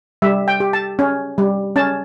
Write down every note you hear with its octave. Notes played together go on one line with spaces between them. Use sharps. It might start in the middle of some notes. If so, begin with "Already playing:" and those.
G3 E5
G5
G4
A5
C#4
G3
C#4 A5